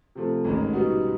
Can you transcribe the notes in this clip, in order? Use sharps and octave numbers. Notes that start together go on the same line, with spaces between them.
C3 F3 A3
A1 G#2 D#3 G#3
B2 G3 B3 D#4 F#4